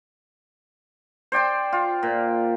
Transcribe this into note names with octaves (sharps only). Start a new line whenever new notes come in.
C5 D5 G5 C6
F4
A#2